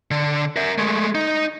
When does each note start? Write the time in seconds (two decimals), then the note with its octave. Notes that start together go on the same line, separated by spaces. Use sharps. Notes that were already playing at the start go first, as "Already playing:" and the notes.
0.11 D3
0.56 A#4 E5
0.78 G#3 A3
1.15 D#4